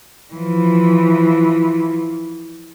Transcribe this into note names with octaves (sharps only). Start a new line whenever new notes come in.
E3 F3